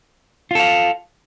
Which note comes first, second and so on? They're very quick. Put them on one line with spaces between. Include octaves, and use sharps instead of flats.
F4 A4 F5